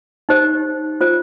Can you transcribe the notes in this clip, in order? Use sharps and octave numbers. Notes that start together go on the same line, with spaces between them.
D#4 G4 C5
F4 C5